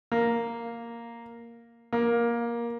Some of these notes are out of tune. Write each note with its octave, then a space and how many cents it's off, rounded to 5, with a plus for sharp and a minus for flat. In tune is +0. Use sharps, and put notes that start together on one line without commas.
A#3 +0
A#3 +15